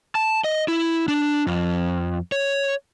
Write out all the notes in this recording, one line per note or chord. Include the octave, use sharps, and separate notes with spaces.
A5
D#5
E4
D4
F2
C#5